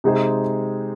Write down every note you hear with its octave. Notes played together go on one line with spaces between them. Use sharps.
C3 G#3 D#4 G#4 C5